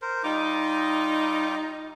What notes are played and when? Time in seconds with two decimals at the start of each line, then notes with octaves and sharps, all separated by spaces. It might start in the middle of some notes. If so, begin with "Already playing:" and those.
0.02 A#4 C5
0.24 G3 D#4 F4 D6